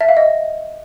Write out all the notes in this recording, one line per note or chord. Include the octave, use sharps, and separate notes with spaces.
E5
F5
D#5